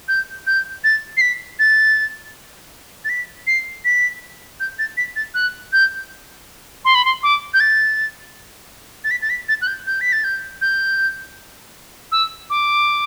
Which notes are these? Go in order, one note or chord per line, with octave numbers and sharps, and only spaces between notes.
G6
G6
A6
C7
B6
A6
A6
B6
C7
B6
G6
A6
B6
A6
F#6
G6
C6
B5
C6
D6
G6
A6
A6
B6
A6
B6
A6
F#6
G6
G6
B6
A6
G6
G6
E6
D6